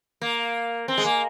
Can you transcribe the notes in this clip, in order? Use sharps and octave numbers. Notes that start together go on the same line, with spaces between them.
A#3
C4
G#3
A#3